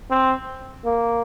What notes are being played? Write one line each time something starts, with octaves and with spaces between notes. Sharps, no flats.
C4
A#3